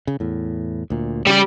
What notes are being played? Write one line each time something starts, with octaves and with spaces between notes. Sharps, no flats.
C#3
E2 A2
D2 A#2
C#3 G3 D5